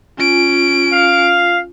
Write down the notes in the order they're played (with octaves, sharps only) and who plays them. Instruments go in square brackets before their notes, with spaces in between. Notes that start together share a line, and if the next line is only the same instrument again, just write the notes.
[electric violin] C#4 D7 [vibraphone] F4 G#5
[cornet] F5